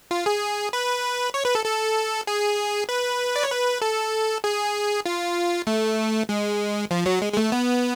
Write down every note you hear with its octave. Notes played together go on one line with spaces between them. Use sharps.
F4
G#4
B4
C#5
B4
A4
A4
G#4
B4
D5
C#5
B4
A4
G#4
F4
A3
G#3
F3
F#3
G#3
G#3
A3
B3